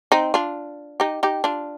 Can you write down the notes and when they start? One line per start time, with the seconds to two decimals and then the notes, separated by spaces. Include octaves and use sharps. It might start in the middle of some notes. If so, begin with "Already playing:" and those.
0.12 C4 D#4
0.34 D4 F4
1.00 D#4 G4
1.23 D#4 G4
1.44 D4 F4